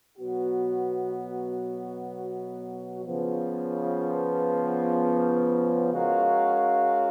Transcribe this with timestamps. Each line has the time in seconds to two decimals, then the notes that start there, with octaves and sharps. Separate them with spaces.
0.18 B2 F#3 B3 F#4
3.04 C#3 F3 B3
5.92 G#3 C#4 F#4 A#4 F5